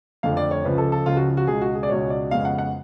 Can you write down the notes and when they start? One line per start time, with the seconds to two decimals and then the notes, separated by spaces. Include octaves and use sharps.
0.23 F2 D3 F3 A3 F5
0.37 D5
0.51 C#5
0.64 C#2 C#3 F3 B4
0.78 A4
0.92 A4
1.06 C#2 C#3 F3 F4
1.17 F#4
1.37 F#4
1.47 C#2 B2 G#3 G#4
1.61 F#4
1.75 G#4
1.83 D5
1.89 C#2 B2 G#3 C#5
2.10 D5
2.31 F2 C#3 G#3 B3 F5
2.45 F#5
2.58 F#5